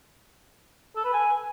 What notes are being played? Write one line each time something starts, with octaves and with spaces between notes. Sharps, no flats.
A4
B4
G#5